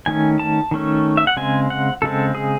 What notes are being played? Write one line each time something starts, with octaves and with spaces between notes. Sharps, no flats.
D#3 A3 C#4 G#5
A5
D#3 A3 C#4
E5
F#5
C#3 G#3 C4 G#5
F#5
C#3 G#3 C4 A4
G#4